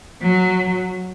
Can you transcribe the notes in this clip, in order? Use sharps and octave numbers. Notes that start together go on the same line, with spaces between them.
F#3